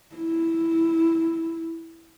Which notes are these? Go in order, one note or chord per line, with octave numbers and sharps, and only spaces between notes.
E4